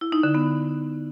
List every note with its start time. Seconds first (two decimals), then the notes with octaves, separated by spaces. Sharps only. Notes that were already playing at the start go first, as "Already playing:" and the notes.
0.01 E4
0.12 D#4
0.23 D3
0.35 B3